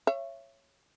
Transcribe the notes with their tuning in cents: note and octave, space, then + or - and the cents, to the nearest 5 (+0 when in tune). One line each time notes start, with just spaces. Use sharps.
C#5 -10 E5 +35